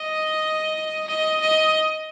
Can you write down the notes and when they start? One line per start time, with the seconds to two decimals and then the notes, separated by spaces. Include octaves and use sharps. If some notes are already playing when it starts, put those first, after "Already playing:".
Already playing: D#5
1.08 D#5
1.41 D#5